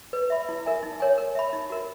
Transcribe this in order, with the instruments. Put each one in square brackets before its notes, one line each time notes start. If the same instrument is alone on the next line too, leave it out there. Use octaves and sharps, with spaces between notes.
[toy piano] B4
E5 B5
E4
A#4 E5 G#5
D#4
A#4 C#5 G#5
A#4
E5 B5
D#4
F#4 A#4